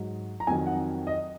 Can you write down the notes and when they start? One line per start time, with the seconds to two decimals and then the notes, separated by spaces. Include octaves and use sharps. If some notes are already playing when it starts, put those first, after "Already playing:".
Already playing: G#2 F#3
0.40 A#5
0.47 F2 D#3 F#3 G#5
0.66 F#5
1.07 D#5